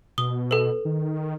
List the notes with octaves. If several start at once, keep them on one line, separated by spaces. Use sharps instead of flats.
B2 D#6 G7
A4 B4
D#3